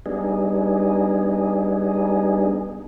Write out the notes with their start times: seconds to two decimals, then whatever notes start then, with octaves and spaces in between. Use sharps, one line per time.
0.06 G3 B3 D4 D#4 G#4